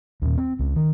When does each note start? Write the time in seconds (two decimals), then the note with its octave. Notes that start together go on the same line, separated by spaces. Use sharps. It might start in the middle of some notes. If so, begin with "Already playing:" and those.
0.22 D#2 A#2
0.38 C4
0.59 C#2
0.76 D#3